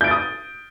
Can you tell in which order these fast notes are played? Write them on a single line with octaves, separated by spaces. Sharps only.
G6 D7 A6 D#6